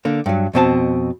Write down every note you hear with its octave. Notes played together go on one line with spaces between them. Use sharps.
D3 A#3
G2 F#3
F2 B2 C4 A5